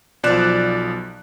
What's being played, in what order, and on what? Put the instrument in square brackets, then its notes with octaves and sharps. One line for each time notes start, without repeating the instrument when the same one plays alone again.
[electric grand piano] B1 F3 D5 F#6 E7